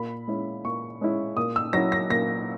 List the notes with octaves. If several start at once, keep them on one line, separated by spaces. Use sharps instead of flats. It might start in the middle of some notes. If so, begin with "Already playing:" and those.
Already playing: A#2 B5
G#3 C#4 E4
A#2 C#6
G#3 C#4 E4
A#2 D#6
E6
F#3 C#4 E4 A#6
A#6
A#2 A#6